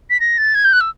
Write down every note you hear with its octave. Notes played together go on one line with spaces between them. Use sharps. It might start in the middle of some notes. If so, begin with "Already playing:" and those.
B6
A#6
A6
G#6
G6
F#6
E6